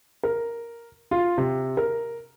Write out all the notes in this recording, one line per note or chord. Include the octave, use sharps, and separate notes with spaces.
A#4
F4
C3
A#4